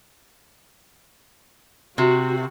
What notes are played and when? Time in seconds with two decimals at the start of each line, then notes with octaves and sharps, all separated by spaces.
1.98 C3 F#4